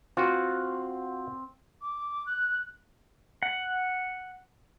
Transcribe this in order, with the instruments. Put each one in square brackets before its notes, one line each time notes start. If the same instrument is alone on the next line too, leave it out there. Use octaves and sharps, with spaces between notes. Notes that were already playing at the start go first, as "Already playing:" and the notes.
[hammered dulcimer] C4 [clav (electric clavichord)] F4 F#4
[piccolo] D6
F#6
[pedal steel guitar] F#5